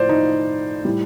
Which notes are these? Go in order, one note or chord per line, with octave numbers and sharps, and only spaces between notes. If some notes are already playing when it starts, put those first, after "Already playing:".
Already playing: A2 F3 C5 D5
D#4
A2 G3